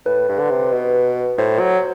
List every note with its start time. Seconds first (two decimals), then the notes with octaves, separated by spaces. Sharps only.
0.06 A2 B4
0.28 G2
0.39 D3
0.50 C3
0.72 B2
1.38 A2 C5
1.59 F#3